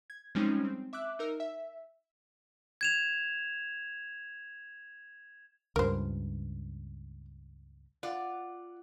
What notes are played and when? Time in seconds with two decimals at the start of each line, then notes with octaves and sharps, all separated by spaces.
0.10 G#6
0.35 F3 G3 G#3 C4 C#4 D#4
0.65 C4
0.93 E5 D6 E6 F#6
1.19 D#4 A#4 E6
1.40 E5
2.81 G#6 E7 F7
5.76 C#2 G2 A#4 C5
8.03 F4 D5 F#5